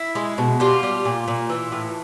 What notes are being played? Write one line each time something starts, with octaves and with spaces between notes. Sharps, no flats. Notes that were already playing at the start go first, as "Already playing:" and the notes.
Already playing: E4
G#3
B2
G3 F4
G3
A#2
A#2
E3
A2